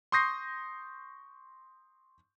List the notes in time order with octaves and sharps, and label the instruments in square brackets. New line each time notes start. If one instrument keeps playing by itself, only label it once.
[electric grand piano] C6 C#6 D#6 G6 A#6 C7